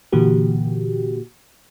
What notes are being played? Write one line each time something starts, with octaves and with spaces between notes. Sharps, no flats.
A#2 D3 E3 A#3 F#4 G4